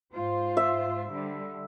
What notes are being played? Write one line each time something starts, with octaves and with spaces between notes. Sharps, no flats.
G#2 F4 C5
E5
D3 G3